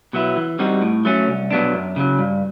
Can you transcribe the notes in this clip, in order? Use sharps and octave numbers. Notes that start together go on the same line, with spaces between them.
B2 F#3 B3 E4
E3
G3 C4 D#4 F#4
A2
F#3 A3 C#4
C2
B2 F#3 B3 D4
F#2
C#3 F#3
G2